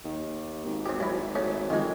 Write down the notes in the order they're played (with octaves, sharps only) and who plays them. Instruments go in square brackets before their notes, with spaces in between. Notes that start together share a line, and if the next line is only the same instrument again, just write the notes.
[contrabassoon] D#2
G#1
[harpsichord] C4 G4
F#2 E4
A3 C#4
[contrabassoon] F2 [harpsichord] D#3 G#3